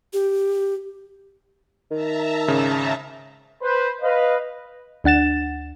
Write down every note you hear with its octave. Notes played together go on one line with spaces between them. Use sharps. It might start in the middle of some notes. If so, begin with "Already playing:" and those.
G4
D#3 E5 A5 A#5
G#1 C#3
B4 C5
B4 D#5 F5
D2 D4 F#5 A6 E7